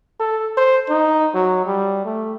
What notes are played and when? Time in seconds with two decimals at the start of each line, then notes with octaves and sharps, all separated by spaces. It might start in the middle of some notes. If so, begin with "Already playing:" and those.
0.20 A4
0.57 C5
0.90 D#4
1.34 F#3
1.66 G3
2.05 A3